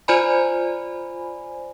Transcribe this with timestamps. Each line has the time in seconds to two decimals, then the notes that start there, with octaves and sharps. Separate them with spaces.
0.08 F4 C5 D5 G#5 B5